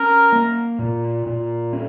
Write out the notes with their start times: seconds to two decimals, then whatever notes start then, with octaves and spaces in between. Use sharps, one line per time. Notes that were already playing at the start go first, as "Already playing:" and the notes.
Already playing: C#4 A#4
0.32 A#3
0.79 A#2
1.26 A#2
1.73 C#4